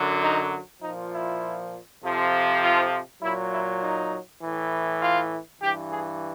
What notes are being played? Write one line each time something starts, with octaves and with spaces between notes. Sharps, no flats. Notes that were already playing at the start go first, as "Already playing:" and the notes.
Already playing: F#2 D3 F#3
D#4
A#2 F3 D#4
E4
F2 C3 F3
F4
A#2 F#3 E4
E4
D#4
A2 E3
F4
G2 E3 G4
G#4